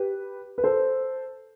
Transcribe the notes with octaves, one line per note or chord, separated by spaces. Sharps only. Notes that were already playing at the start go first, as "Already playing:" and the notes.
Already playing: G4 B4
B4
A4 C5